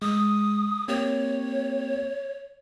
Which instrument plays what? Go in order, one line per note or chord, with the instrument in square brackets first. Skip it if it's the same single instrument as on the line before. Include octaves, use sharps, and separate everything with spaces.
[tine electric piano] G#3 [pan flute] D#6
[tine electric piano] A#3 C4 G4 [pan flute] C#5